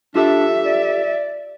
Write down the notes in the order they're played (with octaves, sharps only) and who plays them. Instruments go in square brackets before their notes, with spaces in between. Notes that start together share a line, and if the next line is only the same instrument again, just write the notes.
[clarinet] D4 [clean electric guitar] F4 G4 A4 [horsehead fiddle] E5
[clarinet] D5